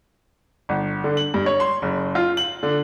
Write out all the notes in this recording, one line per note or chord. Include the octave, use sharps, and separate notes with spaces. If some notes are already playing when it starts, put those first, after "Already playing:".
G1
D3
F#7
G2
C#5
C6
F#1
F4
F#7
D3